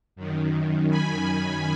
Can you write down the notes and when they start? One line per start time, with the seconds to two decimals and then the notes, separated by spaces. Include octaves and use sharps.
0.16 F#2 D#3
0.90 G#5 B5
1.27 G#5 B5